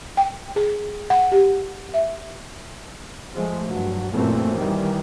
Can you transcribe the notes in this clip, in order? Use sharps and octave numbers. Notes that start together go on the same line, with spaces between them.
G5
G#4
F#5
G4
E5
F3 G#3 A3
G2 F#3
F#2 A#2 E3 A3 A#3 C4
D#3 E3 G3